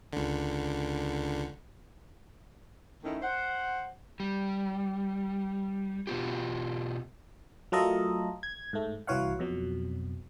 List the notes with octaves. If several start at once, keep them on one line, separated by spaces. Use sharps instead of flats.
C#2 D3
D#3 A3 C#4 D#4 E4
C5 F#5
G3
B2 B3 F4 G4
F#3 A3 F4 A4 A#4 D#5
G#6
G#2 A3
C2 E3 F#4 C#5 F5 F#5
F2 B2 F#3